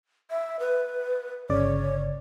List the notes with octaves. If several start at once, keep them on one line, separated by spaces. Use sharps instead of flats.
E5
B4
G1 C#3 C#5 D5